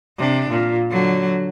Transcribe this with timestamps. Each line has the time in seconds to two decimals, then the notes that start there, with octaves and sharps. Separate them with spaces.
0.18 C3 D4
0.49 A#2
0.91 D3 F#3